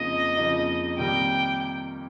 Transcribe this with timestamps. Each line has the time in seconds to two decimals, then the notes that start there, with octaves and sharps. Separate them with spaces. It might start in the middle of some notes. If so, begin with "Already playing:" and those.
Already playing: F2 C#3 F3 A#3 D#4 D#5
0.37 F2 C#3 F3 A#3 D#4
0.98 C3 D#3 G3 A#3 G5